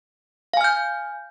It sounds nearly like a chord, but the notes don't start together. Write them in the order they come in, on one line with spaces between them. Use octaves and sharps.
F5 G#5 F6 G6